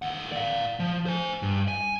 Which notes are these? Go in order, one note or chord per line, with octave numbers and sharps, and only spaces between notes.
D#2 F#5
D5 F5
F3
C5 G#5
G2
G#5